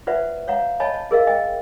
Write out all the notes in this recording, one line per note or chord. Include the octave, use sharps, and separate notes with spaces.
F4 B4 C5 D5 E5 F#5
C#5 F5 F#5 A#5
C#5 D#5 G#5 A5 B5
A5
G#4 A#4 D#5 F5
D#5 G5 G#5